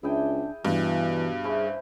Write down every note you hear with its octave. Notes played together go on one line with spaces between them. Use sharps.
C#2 D4 E4 G#4 G5
G2 B2 E3
C#4 E4 G#4 C5